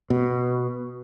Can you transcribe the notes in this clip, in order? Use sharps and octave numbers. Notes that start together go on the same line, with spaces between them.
B2